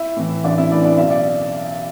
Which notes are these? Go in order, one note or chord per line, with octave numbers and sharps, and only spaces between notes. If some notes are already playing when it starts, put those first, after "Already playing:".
Already playing: E4 E5
A2 E3
A1 D4 D5
E4 E5
A2 E3 D4 D5
D4 D5
B1 E5
D5